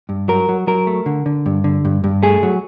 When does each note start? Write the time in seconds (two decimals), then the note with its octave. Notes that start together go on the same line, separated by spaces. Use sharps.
0.09 G2
0.28 F#3 A#4
0.49 F#3
0.67 F#3 A#4
0.87 A3
1.06 D3
1.26 D3
1.46 G2
1.64 D3
1.85 G2
2.04 G2
2.23 A3 G#4
2.43 F#3